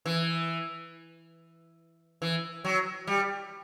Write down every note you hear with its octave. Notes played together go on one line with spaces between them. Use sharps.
E3
E3
F#3
G3